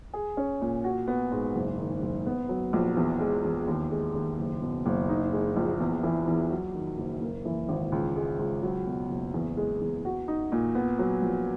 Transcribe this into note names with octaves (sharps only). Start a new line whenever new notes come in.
G#4
C#4
A#2
F#4
B3
G#2
F#1
D#3
F#1
B3
F#3
A#1
E2
G#3
E2
D#2
G#3
D#2
F#1
B2
F#1
D#4
G#3
A#1
E2
E3
E2
F#3
D#3
F#1
A#3
E3
G#1
C#2
G#3
C#2
F#3
B2
F#1
E2
G#3
E2
F#4
D#4
A#2
B3
F#3
A#1